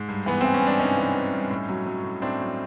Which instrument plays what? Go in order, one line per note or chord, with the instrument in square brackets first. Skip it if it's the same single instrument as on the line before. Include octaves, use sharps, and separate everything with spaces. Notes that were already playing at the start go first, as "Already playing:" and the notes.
Already playing: [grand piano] G#2
G2
E3 B3
E3 C4
C#4
G2 D4
G2 C#4 D#4
E3
E3
G2
A2
F#3
F#3
A2
A2 C4 D4
F#3